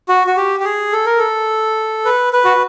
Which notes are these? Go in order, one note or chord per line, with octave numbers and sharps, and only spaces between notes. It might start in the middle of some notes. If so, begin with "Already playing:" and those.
F#4
F#4
G4
G4
G#4
A4
A#4
A4
B4
B4
F#4